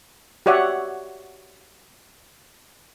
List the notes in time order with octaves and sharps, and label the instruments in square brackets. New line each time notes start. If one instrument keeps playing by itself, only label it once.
[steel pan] F#4 G4 C#5 D5 E5 F#5